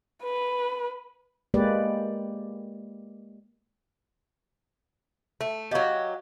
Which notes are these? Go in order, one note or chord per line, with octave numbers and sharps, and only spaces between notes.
B4
G#3 A#3 G4 B4 D5
A3
F#3 G4 D#5 F5 C#6